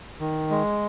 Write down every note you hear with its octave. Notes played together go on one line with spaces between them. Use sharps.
D#3
G#3